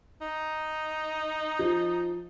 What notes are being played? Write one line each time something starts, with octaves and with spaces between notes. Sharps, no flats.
D#4
F3